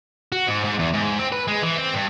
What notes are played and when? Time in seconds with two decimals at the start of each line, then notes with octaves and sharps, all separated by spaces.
0.32 F#4
0.47 G#2
0.64 G#2
0.79 E2
0.94 G#2
1.19 C4
1.32 B4
1.48 G#3
1.63 E3
1.77 C4
1.94 G2